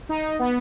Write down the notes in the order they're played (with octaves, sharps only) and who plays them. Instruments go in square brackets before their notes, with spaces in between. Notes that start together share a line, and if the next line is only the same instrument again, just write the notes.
[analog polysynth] D#4
B3